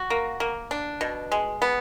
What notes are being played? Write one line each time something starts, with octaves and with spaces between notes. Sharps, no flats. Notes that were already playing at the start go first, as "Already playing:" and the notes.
Already playing: F#4
A#3
A#3
D4
B2
G#3
B3